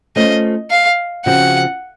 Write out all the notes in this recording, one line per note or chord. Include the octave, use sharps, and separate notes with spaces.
A3 C#4 F4 C5 D#5
F5
C#3 F3 C4 F#4 F#5